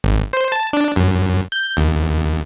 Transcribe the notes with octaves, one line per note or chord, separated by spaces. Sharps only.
G#1
C5
A5
D4
F#2
G6
D#2